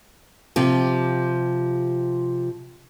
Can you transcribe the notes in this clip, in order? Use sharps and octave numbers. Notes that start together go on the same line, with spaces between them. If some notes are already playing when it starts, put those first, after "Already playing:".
C3 F3 G4